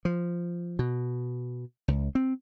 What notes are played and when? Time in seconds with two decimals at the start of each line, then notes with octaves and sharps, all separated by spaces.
0.05 F3
0.79 B2
1.88 C#2
2.15 C4